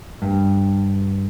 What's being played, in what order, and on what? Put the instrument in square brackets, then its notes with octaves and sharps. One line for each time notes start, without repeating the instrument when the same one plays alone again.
[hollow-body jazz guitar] G2